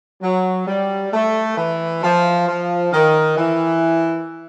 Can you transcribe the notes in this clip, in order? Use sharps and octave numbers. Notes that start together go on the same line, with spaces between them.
F#3
G3
A3
E3
F3
F3
D#3
E3